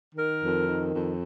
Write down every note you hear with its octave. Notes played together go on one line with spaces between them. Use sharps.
D#3 A#4
F2
D#3
F2